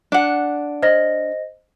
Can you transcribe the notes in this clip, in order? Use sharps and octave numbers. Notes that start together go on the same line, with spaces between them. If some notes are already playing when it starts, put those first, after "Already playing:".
D4 F#5
C5 D#5 A#6